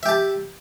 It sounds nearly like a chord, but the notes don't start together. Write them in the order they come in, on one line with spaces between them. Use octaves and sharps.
E5 G4 A5